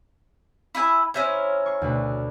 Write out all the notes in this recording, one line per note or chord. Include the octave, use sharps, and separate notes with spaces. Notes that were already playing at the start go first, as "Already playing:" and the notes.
E4 E5 G#5
C#4 E4 G#4 A#4 C5 C#5
C#6 C7
D2 B2 B4